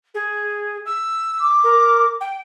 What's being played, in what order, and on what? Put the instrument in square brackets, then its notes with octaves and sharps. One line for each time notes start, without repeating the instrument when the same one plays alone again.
[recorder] G#4
E6
[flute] D6
[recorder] A#4
G5